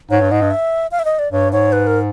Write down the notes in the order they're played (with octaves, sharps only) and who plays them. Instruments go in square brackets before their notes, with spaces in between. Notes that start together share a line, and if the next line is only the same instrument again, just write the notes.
[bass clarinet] G#2 [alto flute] C#5
[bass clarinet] G2
[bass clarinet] G#2 [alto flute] D#5
[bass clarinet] G2
[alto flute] E5
F5
E5
D#5
D5
[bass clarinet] G2 [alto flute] C#5
[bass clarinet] G#2 [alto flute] C#5
[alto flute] B4
A#4